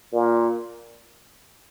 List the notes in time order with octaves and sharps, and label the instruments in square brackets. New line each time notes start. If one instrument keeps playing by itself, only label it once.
[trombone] A#2